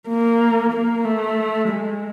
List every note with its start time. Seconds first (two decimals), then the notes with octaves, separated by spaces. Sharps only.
0.09 A#3
0.72 A#3
1.05 A3
1.68 G#3